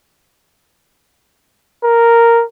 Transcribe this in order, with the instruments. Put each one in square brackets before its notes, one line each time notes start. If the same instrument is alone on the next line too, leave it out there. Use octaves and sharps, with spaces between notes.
[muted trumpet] A#4